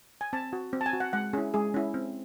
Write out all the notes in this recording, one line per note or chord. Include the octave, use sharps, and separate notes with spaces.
G#5
C4 A5
F#4
C4
A5
G#5
F#4
F#5
G#3 F#5
C#4 E4 G#4
G#3 G#4
C#4 E4
C4